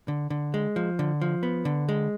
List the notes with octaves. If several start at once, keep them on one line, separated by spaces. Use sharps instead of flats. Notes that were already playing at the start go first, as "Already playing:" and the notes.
D3
D3
G#3
F3
D3
F3
B3
D3
G#3